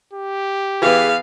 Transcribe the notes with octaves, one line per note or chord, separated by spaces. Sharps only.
G4
E3 B3 G#4 B4 F5